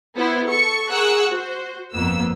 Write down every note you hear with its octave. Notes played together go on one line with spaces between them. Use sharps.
B3 E4 C5
A4 C#6 C#7
G#4 A#4 F#5 C#6 E6 F#6
F#4 C5
G1 F2 A#3 B3 E6